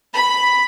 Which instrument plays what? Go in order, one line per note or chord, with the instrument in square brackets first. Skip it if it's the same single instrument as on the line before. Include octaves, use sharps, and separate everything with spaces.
[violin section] B5